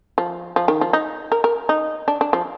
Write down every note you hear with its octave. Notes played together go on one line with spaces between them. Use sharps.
F3
F3
D#3
F3
D#4
A#4
A#4
D#4
D4
D4
F3